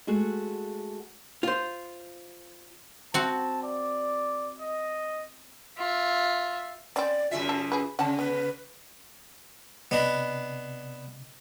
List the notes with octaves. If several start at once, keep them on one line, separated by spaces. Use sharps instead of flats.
G#3 A3 F#4 F#5
F4 C5
C4 F#4 A5
D5
D#5
F4 E5
C4 C#4 D5
F#2 C#3 F4 E5
A4
G#4 B4
C#3 C#4 F#5 A5
B3 B4
C3 B3 D4 B4 D#5